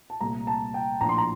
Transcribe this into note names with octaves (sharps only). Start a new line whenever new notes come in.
A5
C2 A#2 A3 A#5
A5
G5
A#1 A2 F3 A#5
C6
A#5